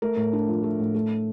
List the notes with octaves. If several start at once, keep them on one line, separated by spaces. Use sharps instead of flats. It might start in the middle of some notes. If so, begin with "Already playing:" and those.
A3 A#4
A2
D4
F3
A3
A2
A3